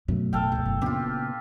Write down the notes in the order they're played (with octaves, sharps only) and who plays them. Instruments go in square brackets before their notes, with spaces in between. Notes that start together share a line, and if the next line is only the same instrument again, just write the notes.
[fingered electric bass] F#2 B2 A3 [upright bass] F#3
[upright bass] A1 [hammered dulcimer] A4 F5 G5
[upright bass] C#2 G#2
F#1
[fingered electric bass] A#2 C#3 B3 [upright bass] D4 [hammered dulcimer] F4 G4